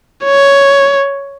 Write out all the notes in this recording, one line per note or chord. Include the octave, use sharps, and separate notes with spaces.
C#5